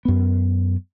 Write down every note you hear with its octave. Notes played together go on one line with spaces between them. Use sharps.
F#2 B3